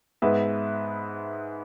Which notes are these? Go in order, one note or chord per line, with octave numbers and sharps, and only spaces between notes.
G#2 G#3 B3 B4 E5